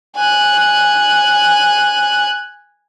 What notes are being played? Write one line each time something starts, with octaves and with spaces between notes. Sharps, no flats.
G#5 F#6